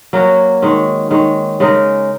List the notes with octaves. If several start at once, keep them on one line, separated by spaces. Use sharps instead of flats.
F#3 A#3 C#4 F#4
D#3 G#3 C#4
D#3 G#3 C#4
C#3 G#3 D#4 A#4